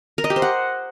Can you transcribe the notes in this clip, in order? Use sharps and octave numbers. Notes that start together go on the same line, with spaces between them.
A#4
D#5
G4
C5
F#5